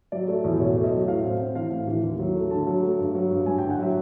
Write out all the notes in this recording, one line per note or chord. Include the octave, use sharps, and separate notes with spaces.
F#3 D5
A3
E2
B2 C#5
A3
D#5
F#3
A2 F5
C4
C4
E3 F5
A2
E3
D#2
F#3
A3
D3 A5
F#3
A3
G2
F#3
G2
G2 G#5
G5
D3
F#5
F#3 E5